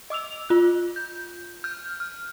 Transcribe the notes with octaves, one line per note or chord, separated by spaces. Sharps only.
D#5 D6 E6 F7
F4 F#6
G6
F6 G6
F6